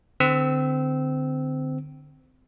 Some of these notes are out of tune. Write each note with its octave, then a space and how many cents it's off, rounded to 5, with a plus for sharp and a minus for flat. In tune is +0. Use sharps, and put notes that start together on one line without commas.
D3 +15 C4 -25 E6 -15